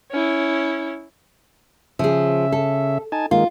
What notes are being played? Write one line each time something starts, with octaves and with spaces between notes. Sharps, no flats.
C#4 E4
C#3 F3 G#4 E5
A4
D#4 G#5 A5
D#3 G#3 A#3 F4